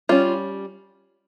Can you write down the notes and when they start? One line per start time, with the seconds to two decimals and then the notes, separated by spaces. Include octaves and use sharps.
0.09 G3 C#4 F4